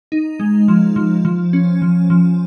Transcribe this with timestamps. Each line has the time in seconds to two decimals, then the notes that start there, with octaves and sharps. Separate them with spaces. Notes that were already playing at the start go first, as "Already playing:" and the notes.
0.12 D#4
0.40 G#3
0.68 F3
0.96 F3
1.25 F3
1.53 C#4
1.82 F3
2.10 F3